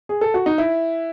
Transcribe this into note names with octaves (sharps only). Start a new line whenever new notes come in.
G#4
A4
F#4
D#4
E4